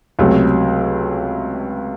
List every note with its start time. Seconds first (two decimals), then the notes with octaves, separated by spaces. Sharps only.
0.19 C#2 C3 F#3 A3